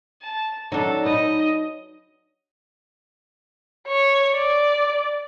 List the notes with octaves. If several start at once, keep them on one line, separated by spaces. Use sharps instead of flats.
A5
F#3 D4 D#4 A4
D#4 B4 D#5
C#5
D5